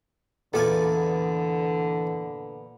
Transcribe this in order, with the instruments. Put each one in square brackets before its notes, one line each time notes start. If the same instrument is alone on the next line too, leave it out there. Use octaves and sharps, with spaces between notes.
[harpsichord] E2 D5 G#5 [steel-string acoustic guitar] A#2 B3 [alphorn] D3 [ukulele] F4 A4